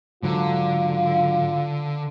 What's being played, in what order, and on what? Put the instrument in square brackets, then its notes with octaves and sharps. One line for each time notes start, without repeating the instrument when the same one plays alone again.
[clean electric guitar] G#2 F#3 [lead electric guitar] D3 [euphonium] F4